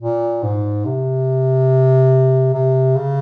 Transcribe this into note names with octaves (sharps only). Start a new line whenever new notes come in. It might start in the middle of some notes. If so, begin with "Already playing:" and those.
A#2
G#2
C3
C3
C#3